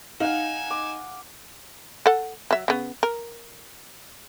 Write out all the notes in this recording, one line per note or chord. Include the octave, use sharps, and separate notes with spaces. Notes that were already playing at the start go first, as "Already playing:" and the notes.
D#4 F5 F#5 G#5 E7
D6
A4 F#5
F#3 E5
C#3 B3
A#4